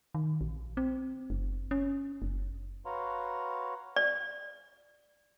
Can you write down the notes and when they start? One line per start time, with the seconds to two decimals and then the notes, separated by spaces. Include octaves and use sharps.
0.15 D#3
0.41 A#1
0.77 C4
1.30 F#1
1.71 C#4
2.22 F#1
2.86 F#4 B4 C#5 F5 A#5 C6
3.96 D5